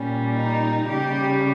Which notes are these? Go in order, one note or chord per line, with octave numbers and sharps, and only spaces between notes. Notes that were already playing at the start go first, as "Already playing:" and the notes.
Already playing: A#2 G3 C#4
D#4
C#3 G3 G4